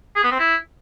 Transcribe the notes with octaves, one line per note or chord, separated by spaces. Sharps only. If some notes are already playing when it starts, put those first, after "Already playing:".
G#4
B3
C4
E4